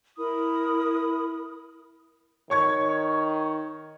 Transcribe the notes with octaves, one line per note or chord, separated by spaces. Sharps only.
E4 A#4 B5 D#6
D#3 C#5 C#6 G#6